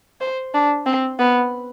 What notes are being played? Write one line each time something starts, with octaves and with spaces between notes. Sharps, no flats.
C5
D4
C4
B3